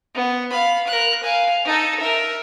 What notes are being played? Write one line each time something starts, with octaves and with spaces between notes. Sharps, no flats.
B3
F5 B5
A#4 F#6
F5 G#5
D#4 A4
A#4 E5